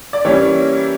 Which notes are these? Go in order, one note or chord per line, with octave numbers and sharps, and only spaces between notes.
D5
E3 G3 A#3 C#4 E4 C#5